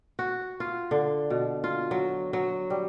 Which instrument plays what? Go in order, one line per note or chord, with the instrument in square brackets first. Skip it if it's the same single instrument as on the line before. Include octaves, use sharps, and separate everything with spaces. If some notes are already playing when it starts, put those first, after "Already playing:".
[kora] F#4
F4
D3
B2
F4
F#3
F#3
G3